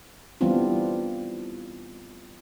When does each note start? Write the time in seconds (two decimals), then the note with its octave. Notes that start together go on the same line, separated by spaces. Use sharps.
0.41 E3 G3 B3 C4 D4 F4